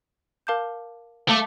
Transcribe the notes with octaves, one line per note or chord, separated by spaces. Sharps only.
A#4 F5 A5 D6 G6
A3 F5 A5 D6